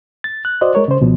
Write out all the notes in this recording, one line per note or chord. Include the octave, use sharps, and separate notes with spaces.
A6
F#6
F#4 C5 D5 D#5
G#3 A#4 C#5
C#3 C5
C#2 B2 F3 B3